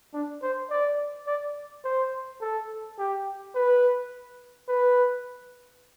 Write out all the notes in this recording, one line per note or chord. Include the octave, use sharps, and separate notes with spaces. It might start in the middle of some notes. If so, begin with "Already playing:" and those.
D4
C5
D5
D5
C5
A4
G4
B4
B4